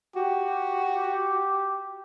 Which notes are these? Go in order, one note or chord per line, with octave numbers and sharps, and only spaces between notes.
F#4 G4